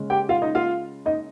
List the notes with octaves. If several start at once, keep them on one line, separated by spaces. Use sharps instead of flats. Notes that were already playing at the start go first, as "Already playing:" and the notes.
Already playing: C#3 G#3 C#4
G4 G5
F4 F5
D#4 D#5
F4 F5
D#4 D#5